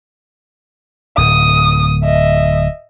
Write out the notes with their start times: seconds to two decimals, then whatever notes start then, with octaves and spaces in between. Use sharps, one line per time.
1.18 D1 D#6
2.04 D#5 E5